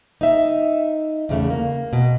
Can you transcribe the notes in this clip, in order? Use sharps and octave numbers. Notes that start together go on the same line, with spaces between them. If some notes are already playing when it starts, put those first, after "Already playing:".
D#4 E5
E2 C#3 A3
A#3
B2